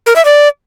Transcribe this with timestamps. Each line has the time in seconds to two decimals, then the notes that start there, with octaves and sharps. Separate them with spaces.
0.06 A#4
0.16 E5
0.25 D5